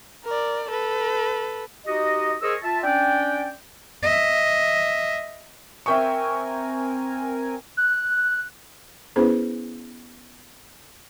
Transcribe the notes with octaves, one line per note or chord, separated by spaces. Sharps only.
A#4 D5
A4 B4
D#4 F#4 G4 D#5
G#4 A#4 C5 C#5 D#5 E6
F4 E5 A5
C#4 D4 D5 G5
D#5 E5
C4 A#4 E5 G5 G#5 C#6
F#6
B3 C#4 E4 G#4 B4 C5